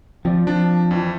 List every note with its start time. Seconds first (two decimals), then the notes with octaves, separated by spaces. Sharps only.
0.25 F3 C4 D5
0.47 F3 D4
0.91 F2 E3